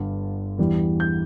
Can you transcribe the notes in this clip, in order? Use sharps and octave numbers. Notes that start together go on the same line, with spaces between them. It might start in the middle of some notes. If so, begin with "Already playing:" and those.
Already playing: G1 G2 D3
E2 E3 G3
G6